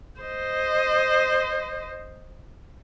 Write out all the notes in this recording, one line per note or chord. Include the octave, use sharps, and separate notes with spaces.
C5 D#5